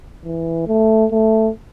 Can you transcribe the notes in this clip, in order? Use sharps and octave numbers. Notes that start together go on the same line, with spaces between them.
E3
A3
A3